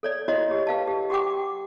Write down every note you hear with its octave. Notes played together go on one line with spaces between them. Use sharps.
A4 C#5 D5
E4 F#4 C#5 D#5
G4
B4 F5 A5
G4
F#4 G4 F#5 G5 D6